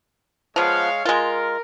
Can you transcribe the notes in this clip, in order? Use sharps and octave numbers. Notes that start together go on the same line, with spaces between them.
F3 G#3 B3 C#5 F5
G#3 F4 A#4